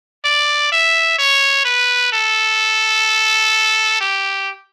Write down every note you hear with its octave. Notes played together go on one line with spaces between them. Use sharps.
D5
E5
C#5
B4
A4
G4